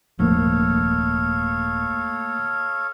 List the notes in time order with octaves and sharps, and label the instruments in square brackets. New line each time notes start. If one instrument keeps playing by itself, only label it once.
[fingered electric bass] D#1 G#1 F3 [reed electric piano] A3 A#3 [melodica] A4 C#5 F5